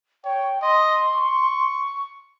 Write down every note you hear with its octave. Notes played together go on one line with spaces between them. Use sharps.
C#5 G5
D#5 C6
C#6